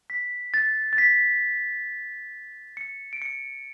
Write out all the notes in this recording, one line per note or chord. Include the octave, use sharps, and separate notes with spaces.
B6
A6
A6
B6
C#7
D7
C#7